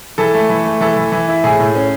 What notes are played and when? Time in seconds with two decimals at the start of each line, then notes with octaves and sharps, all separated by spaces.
0.18 E3 A4
0.34 A3
0.49 E3
0.65 A3
0.80 E3 A4
0.96 E3
1.12 E3
1.28 E4
1.44 A2 G#4
1.59 A2
1.75 C#4